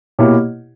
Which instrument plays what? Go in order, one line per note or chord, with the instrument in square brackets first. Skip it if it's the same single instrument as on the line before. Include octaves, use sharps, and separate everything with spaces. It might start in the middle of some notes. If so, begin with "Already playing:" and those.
[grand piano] B2 A#3 E4 G4 C#5